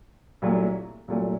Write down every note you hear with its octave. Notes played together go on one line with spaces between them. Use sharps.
C2 A#2 F#3 A3
C2 A#2 F#3 A3